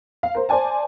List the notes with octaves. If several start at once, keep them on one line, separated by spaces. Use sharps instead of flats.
F5
A#4 C5
C5 D5 G#5 A5